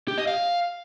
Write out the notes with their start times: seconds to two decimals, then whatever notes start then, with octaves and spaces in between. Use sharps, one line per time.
0.08 G4
0.18 D#5
0.27 F5